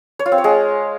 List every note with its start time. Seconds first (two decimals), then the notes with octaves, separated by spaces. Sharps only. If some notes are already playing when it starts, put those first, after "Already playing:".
0.19 C#5
0.26 F4
0.32 C4
0.38 C#5
0.44 G#3